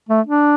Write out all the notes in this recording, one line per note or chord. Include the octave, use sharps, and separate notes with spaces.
A3
D4